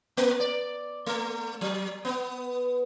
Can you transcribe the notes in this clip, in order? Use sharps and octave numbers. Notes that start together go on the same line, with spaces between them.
A#3
D5
A3
F#3
B3